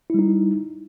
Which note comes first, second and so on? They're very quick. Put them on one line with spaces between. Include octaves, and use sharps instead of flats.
E4 G3 D#4